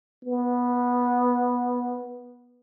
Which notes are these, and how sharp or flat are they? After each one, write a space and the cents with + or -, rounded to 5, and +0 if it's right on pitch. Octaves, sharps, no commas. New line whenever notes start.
B3 -10